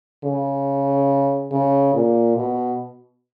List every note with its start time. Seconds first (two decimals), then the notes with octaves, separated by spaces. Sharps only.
0.24 C#3
1.52 C#3
1.94 A#2
2.36 B2